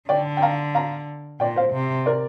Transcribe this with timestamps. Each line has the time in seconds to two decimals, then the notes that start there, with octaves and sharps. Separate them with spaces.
0.09 D3 D5 G5
0.37 G5
0.42 F5 A#5
0.75 F5 A#5
1.40 A#2 D5 G5
1.56 C5 F5
1.73 C3
2.06 A#4 D5